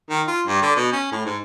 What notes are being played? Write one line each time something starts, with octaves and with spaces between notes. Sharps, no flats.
D#3
F4
G2
D3
B2
C#4
A2
G#2